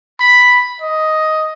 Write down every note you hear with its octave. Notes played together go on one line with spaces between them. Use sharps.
B5
D#5